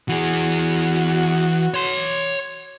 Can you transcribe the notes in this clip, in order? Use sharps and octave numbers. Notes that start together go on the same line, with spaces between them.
E3 F#4 G#4
C#5 C6